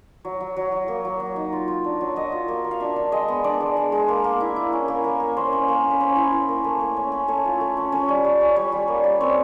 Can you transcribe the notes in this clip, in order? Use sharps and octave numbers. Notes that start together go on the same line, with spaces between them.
F#3
F#3
F#3
F#3
A#3
F#3
F#3
D#4
F4
F4
D4
F#3
F#3 D#5
F4
A#3
A#3
F5
D4 E5
D4
G#3 D#5
B3
D4 D5
G#3
G#3
G#3
A#3
A#3
E4
E4
C#4
A#3
A#3
A#3
C#4 C5
C#4
A#3
C#4
B4
C#4 C5
E4
C#4
A#3
A3
A3
C#4
C#4
A3 C#5
F4
A3
C#4
C#4 C#5
G3
G3
C#4
G3 C#5
G3
A#3
G3
C4 C#5